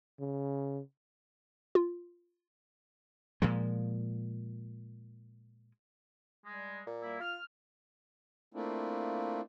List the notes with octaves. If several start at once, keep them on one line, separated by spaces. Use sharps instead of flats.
C#3
F4
A#2 F3 G#3
G3 G#3
A#2
G3 A#3 E4
F4 F6
A3 A#3 C4 D4 E4 F4